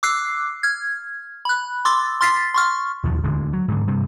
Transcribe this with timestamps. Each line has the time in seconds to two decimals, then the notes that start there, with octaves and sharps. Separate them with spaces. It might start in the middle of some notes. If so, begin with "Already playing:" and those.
0.03 D6 E6 F#6 C7
0.63 F6 G#6
1.45 B5 F#6
1.85 C6 D6 E6 A6
2.21 C6 F6 A6 B6 C7
2.54 C6 C#6 F6
3.04 D#2 B2 F3
3.24 D1 D3 G#3
3.53 F#3
3.68 G#2 D3
3.87 G2 C3